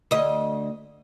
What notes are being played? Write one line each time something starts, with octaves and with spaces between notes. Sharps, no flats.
D2 D#5